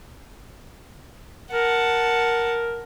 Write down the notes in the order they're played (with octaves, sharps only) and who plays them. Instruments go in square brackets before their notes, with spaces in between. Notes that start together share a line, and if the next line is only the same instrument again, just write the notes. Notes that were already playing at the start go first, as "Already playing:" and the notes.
[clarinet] A#4 [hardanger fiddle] F#5 A5